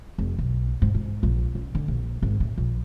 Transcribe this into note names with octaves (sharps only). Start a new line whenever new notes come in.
F1
B1
G#2
G#2
A#1
C#3
D3
A#1
G#1
A2
A#1